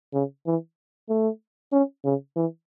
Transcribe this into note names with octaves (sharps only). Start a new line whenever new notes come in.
C#3
E3
A3
C#4
C#3
E3